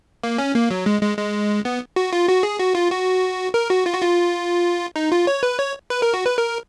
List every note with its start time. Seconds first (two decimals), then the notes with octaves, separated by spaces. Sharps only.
0.23 A#3
0.38 C#4
0.55 A#3
0.71 F#3
0.86 G#3
1.02 G#3
1.18 G#3
1.65 B3
1.96 F#4
2.13 F4
2.28 F#4
2.43 G#4
2.59 F#4
2.75 F4
2.91 F#4
3.54 A#4
3.70 F#4
3.86 F4
3.94 F#4
4.02 F4
4.96 D#4
5.12 F4
5.27 C#5
5.43 B4
5.58 C#5
5.90 B4
6.02 A#4
6.14 F#4
6.26 B4
6.38 A#4